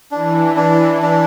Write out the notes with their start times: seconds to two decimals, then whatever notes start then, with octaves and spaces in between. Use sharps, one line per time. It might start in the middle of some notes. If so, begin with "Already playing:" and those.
0.11 E3 D4
0.56 D4
1.02 D4